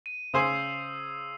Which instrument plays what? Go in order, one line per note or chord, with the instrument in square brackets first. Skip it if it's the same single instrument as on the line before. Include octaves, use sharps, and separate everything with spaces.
[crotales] D#7
[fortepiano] C#3 C5 G#5 [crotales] D#6 E6 C7